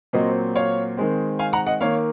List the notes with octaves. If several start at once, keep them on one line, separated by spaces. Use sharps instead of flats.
A#2 F#3 C4 C5 D#5
C#5 F5
D#3 G#3 C4
F5 G#5
F#5 A#5
D#5 F#5
D#3 A#3 C#5 F5